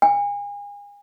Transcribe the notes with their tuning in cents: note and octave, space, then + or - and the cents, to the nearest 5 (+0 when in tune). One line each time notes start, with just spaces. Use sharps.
G#5 -35